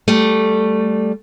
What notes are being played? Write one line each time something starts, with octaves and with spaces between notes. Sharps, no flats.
G3 A3